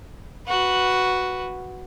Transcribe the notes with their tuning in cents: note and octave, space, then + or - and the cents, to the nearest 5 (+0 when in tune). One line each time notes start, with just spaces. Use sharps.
F#4 +0 B4 +0